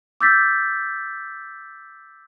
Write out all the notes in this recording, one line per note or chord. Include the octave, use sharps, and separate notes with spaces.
D6 E6 G6 A6 B6